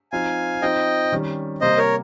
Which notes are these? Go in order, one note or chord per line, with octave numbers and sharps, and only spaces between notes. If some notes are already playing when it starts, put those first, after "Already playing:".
F3 C4 D#4 F5 G#5
F3 C4 D#4 D#5 G5
D#3 G3 C#4
C3 G3 A#3 C5 D#5
A#4 C#5